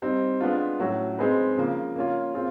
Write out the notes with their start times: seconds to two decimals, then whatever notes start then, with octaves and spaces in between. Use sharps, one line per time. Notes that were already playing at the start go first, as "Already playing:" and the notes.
0.02 G3 C4 D#4
0.41 G#3 B3 D4 F4
0.80 A2 F#3 A3 C#4 F#4
1.19 G#3 C4 D#4 G#4 B4
1.57 C#3 F3 A#3
1.96 A#3 C#4 F4
2.35 C4 F4 G#4